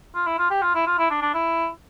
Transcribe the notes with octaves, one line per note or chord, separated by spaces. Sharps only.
F4
E4
F4
G4
F4
E4
F4
E4
D4
D4
E4